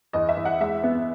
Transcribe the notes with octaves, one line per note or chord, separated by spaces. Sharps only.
E2 D#5
E5
E2
F#5
G#3 E5
B3